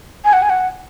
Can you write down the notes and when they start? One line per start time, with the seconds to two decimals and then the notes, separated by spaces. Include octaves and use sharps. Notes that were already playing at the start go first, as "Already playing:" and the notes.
0.25 G#5
0.33 F#5
0.42 G#5
0.50 F#5